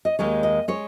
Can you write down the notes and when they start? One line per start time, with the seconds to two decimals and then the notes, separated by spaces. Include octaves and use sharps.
0.05 D#5
0.19 D#2 D#3 G#3 C#5
0.43 D#5
0.68 G#3 C#5